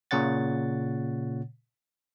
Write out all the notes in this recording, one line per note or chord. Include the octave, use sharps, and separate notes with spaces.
A#2 C#3 C#5 F#5 A6